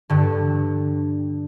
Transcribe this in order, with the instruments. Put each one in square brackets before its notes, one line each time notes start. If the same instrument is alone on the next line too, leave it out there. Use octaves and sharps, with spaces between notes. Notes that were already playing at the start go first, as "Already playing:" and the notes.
[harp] G2 D3